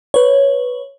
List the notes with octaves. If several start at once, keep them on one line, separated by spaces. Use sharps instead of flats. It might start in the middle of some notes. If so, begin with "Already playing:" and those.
B4 C#5